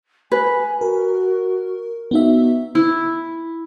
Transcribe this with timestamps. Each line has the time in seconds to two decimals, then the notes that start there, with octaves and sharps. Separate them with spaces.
0.32 B4 G#5
0.81 F#4 A#4
2.11 B3 D#4 F#4 E5
2.75 E4